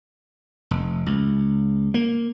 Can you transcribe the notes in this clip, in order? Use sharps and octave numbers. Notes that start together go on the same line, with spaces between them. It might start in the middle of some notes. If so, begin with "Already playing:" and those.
F1
C#2
A#3